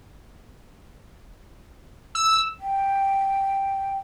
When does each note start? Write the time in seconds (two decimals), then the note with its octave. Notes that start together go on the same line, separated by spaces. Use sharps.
2.15 E6
2.59 G5